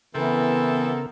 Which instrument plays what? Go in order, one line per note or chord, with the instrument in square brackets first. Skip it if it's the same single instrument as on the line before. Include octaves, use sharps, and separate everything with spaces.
[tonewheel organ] C#3 A#4 [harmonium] E3 [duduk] B3 [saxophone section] C4 E4 A4